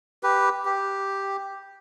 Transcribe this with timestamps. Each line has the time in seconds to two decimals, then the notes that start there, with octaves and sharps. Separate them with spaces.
0.23 G4 B4
0.65 G4